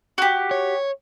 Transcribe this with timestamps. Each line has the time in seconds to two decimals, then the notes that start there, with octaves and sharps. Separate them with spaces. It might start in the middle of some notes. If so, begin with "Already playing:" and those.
0.18 F#4 G4
0.51 C#5